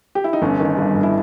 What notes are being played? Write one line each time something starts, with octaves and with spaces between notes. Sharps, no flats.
G4
E4
D#4
G1 C#4
D#3
G2
G1
E4